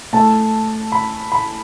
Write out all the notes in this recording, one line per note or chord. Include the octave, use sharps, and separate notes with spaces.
A2 A3 A5
B5
B5